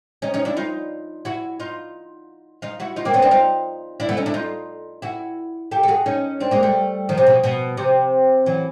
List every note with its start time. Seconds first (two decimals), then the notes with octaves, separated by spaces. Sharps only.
0.22 C#4 D#4
0.34 C#4 D#4
0.45 D4 E4
0.57 D#4 F4
1.25 E4 F#4
1.60 D#4 F4
2.62 D#4 F4
2.80 E4 F#4
2.96 D#4 F4
3.05 A#3 C4
3.13 B3 C#4
3.22 C4 D4
3.31 D#4 F4
4.00 D4 E4
4.09 A3 B3
4.17 C#4 D#4
4.26 D4 E4
4.34 D#4 F4
5.02 E4 F#4
5.71 G4 A4
5.83 A4
5.88 F#4 G#4
6.06 C#4 D#4
6.40 C4 D4
6.51 G#3 A#3
6.63 G3 A3
7.09 D#3 F3
7.18 C3
7.27 B2
7.44 B2
7.77 C3
8.46 E3 F#3